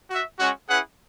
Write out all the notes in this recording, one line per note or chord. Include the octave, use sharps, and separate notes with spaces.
F#4 E5
G#3 C#4 F#4
C#4 E4 G#4 B4 F#5